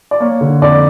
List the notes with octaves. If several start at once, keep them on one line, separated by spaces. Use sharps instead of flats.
D5
A#3 C#5
D3
F2 D5